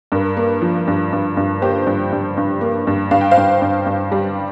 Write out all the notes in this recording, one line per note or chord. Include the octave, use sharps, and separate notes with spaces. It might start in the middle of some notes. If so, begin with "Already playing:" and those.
G2 A#4
A#3
F3
G2
G2
G2
A#3 G4 C5
G2
G2
G2
A#3
G2
G2 F5
G5
C5 F5
G2
G2
G2
G3